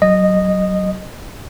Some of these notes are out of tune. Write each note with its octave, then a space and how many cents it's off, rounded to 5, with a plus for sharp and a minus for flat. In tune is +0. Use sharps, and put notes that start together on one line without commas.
F#3 +20 D#5 -10